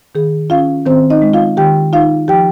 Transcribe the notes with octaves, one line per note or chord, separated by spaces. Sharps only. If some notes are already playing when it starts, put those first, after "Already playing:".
D#3 G#4
C#4 F4 F5
D#3 C4 C5
D#4 D#5
G#3
F4 F5
D#3 G4 G5
D#4 F4 F5
F3 G4 G5